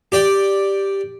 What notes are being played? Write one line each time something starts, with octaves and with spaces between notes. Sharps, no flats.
G4 D5 G5